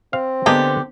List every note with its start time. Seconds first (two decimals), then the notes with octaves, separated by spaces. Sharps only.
0.13 C4 F5
0.46 D3 A#3 B3 D4 G4 G#4 D#5